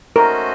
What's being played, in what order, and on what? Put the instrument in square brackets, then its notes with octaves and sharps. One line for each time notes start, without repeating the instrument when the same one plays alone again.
[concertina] A3 C#4 F#4 C5 D#5 [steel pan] A#4